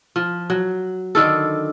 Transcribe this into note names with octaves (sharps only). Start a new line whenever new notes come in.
F3
F#3
D3 D#3 A4